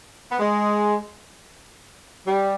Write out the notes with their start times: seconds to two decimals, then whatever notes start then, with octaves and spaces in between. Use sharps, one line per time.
0.30 B3
0.39 G#3
2.27 G3